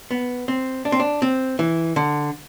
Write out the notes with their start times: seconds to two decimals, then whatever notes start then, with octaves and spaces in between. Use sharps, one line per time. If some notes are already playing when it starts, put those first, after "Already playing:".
0.11 B3
0.48 C4
0.85 D4
0.92 C4
1.00 D4
1.22 C4
1.59 E3
1.96 D3